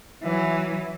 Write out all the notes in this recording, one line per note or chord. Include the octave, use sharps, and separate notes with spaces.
E3 F#3